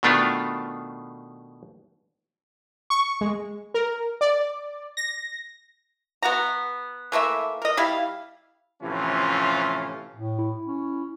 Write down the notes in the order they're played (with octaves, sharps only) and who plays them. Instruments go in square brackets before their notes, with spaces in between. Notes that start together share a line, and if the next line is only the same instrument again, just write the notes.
[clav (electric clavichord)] B2 D#3 A3 B3 D4 F4
[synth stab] C#6
G#3
A#4
D5
A#6
[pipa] B3 F#4 F#5 A#5
E3 A3 A#3 E5
A#4 D#5
G3 E4 F5
[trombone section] A2 C3 E3 F3 C#4 F4
[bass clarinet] A2
[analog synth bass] E4
[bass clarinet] C#4